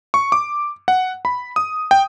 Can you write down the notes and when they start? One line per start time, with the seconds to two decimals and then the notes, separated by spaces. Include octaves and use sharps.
0.14 C#6
0.32 D6
0.88 F#5
1.25 B5
1.56 D#6
1.91 G5